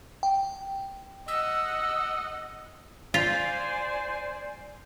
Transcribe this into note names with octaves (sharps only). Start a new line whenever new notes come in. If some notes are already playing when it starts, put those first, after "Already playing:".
G5
D#5 F#5 E6
F4 C5 D5 G#5